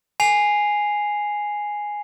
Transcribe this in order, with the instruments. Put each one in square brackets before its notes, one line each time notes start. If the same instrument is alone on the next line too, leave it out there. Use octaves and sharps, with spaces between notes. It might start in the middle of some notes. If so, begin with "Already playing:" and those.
[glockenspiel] G#5 C7 F7